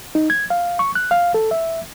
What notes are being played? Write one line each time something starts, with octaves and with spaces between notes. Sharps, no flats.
D#4
G#6
F5
C#6
F#6
F5
A4
E5